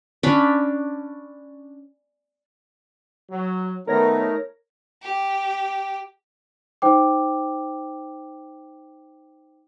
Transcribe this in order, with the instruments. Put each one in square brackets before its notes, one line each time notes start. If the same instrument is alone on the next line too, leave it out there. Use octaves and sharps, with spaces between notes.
[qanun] C#4 D4 B5
[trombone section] F#3
[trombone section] D#3 B3 [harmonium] A3 D#4 [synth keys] A#4 C#5 A#6
[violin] G4
[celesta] D#4 C5 G5 D6